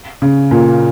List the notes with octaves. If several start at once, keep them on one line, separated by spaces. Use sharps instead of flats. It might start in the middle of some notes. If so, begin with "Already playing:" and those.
C#3
A#2